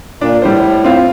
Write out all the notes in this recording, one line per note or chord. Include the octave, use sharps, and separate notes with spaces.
A#2 D4
A2 G3 C5
C4 F4